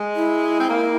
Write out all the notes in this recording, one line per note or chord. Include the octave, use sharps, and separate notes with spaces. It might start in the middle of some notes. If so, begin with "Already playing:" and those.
Already playing: G#3
E4
C4
A#3